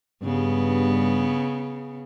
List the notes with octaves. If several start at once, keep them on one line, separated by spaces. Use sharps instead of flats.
G2 C#3 B3